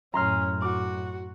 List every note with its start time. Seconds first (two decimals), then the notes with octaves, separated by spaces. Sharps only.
0.14 F#2 A2 C#4 A#5 C6 F6
0.62 F#4 D6